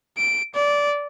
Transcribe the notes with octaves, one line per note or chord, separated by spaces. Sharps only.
D7
D5